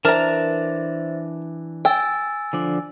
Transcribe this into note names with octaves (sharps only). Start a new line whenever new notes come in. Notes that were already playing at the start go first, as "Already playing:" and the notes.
E3 D4 A#4 C5 E5 A5 A#5 A6
G5 G#5 E6 A6
D3 F3 D4